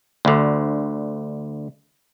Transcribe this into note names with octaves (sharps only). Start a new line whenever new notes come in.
D2 D3